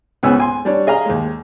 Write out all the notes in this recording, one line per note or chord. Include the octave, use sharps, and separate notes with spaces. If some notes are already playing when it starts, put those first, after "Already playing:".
C#2 G#2 B3 C#5 G#5 E6
G#5 C6
G3 D4 C#5
G#4 D#5 F5 A#5
D#2 G#3